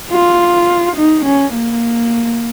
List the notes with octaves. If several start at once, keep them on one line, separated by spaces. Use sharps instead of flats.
F4
D#4
C#4
A#3